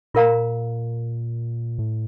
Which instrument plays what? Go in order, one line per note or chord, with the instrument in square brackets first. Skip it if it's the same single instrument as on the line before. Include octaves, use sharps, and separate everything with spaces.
[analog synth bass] A#2 [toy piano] F4 A#4 F5 A#5
[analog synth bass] A2